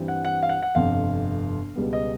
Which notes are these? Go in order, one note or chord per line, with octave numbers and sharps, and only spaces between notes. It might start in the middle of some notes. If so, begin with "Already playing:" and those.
Already playing: G2 E3 G3 C4
F#5
F#5
F5
F#5
F#5
G1 F2 C3 F5
C#2 B2 G3 B3
D#5